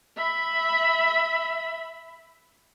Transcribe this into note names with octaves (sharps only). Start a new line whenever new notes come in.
E5 B5